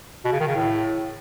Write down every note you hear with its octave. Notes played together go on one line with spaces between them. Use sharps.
B2
C#3
D#3
C#3
A2